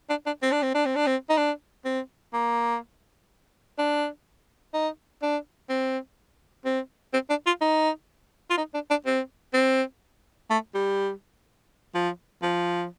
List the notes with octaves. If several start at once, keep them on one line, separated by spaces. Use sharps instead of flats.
D4
D4
C4
D4
C4
D4
C4
D4
C4
D#4
D4
C4
A#3
D4
D#4
D4
C4
C4
C4
D4
F4
D#4
F4
D#4
D4
D4
C4
C4
A3
G3
F3
F3